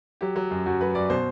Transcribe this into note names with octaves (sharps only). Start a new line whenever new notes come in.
F#3 G4
F#3
F#2
F#2 F#4
F#3 B4
F#2 D5
B2 C5